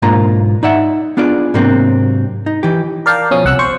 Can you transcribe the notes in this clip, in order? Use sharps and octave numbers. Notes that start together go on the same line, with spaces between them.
B1 G#2 A#3 D4 F4 A#5
D#4 D5 E5 F#5
B3 D4 F4 G#4 D5
G#2 C3 F#3 A#3 C4 D4
D#4
E3 G4
A#4 D5 F5 G5 A5
B2 F3 C#4 F5 D#6
C2 F#5 E6 F#6
C5 C#6